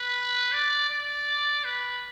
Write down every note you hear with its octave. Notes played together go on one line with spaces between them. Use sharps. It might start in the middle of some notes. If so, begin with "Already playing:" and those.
Already playing: B4
D5
D5
B4